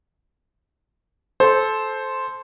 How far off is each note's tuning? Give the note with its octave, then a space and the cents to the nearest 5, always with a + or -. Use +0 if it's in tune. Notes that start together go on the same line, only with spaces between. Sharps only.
A4 -20 C5 +0